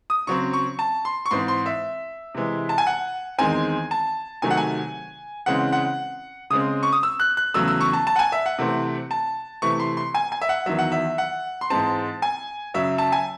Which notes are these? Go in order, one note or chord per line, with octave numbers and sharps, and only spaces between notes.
D#6
C#3 F#3 C4 C#6
C#6
A5
C6
C#6
G#2 E3 C4 C6
C6
E5
C3 E3 G#3
A5
G#5
F#5
E2 D#3 G#3 C4 G#5
A5
C3 D#3 F#3 A3 G#5
F#5
G#5
C#3 E3 G#3 C4 F#5
F#5
C#3 G#3 C4 D#6
C#6
D#6
E6
F#6
F#6
E2 C#3 F#3 A3 E6
E6
C#6
A5
A5
F#5
G#5
E5
F#5
C3 E3 A3 C4
A5
C3 E3 A3 C#6
C6
C6
G#5
G#5
E5
F#5
E2 D#3 F#3 E5
F#5
E5
F#5
C6
G#2 E3 G#3 C4 A5
G#5
F#2 C#3 F#3 E5
A5
G#5